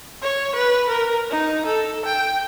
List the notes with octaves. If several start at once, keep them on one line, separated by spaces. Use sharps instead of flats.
C#5
B4
A#4
D#4
A4
G5